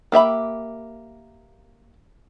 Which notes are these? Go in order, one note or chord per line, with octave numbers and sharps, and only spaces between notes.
A#3 G4 E5 B5